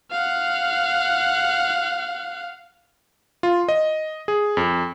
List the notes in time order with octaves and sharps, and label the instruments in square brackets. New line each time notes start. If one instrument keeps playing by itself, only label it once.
[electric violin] F5 F#5
[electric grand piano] F4
D#5
G#4
F2